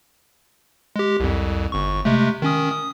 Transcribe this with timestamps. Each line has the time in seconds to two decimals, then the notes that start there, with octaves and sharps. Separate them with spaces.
0.96 G#3 G4
1.20 C2 F2
1.72 G1 C#6
2.05 C3 G#3 A3
2.42 D#3 C#4 D#6
2.72 D#6